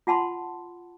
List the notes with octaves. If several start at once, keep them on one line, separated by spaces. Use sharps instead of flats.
F4 F#5 A5 B5 C6